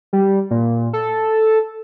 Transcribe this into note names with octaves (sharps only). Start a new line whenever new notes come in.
G3
A#2
A4